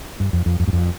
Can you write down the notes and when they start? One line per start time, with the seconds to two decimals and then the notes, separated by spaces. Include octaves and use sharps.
0.20 G2
0.33 F2
0.46 F2
0.60 F2
0.67 G2
0.73 F2